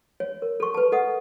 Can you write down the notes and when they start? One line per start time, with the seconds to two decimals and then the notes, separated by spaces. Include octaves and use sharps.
0.20 C#5
0.42 A#4
0.60 A4 C#6
0.74 B4 A5
0.92 A4 D#5 F#5 D#6